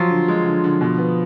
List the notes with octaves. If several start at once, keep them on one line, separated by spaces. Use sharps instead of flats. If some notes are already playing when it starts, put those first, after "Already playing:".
Already playing: F3 F#3 F4
D3
G#3
D3
D3
B2
B3